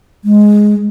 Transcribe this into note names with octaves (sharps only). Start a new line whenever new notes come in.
G#3